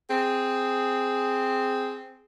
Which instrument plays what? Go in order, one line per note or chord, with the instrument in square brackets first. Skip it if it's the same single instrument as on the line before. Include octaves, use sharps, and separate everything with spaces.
[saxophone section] C4 G#4